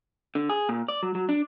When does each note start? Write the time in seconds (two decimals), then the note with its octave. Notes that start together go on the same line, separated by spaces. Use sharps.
0.35 D3
0.49 G#4
0.69 A#2
0.88 D5
1.03 F#3
1.15 F#3
1.29 D4